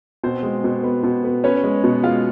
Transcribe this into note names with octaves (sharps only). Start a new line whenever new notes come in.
B2 C4 C5
G#3
B2
B3
B2
B3
B3 C#4 C#5
G#3
B2
G#3 F4 F5